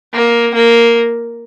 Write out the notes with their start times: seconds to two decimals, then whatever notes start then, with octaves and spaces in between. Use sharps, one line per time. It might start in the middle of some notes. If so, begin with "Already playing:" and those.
0.13 A#3
0.54 A#3